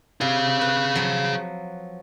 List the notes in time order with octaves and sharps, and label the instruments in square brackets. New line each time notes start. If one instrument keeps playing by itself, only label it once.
[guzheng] C3 [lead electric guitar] G#4 F5
[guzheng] B4
F3 F#3